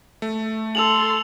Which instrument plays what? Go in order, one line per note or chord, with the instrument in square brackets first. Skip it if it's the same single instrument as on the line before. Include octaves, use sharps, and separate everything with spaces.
[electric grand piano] A3
[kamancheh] A4 C6 [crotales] E6 F7 F#7